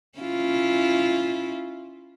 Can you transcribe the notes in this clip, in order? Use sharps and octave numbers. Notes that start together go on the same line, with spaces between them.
C#4 E4 F4